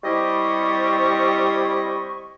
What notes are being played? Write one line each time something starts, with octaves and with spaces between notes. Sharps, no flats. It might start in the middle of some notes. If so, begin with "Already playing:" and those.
G3 C4 E4 G4 D#5 C#6